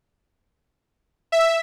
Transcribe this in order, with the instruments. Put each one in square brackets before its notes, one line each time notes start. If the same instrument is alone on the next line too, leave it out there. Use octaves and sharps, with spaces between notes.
[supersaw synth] E5